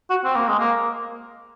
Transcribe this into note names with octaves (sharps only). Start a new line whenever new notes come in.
F#4
C4
A#3
G#3
A#3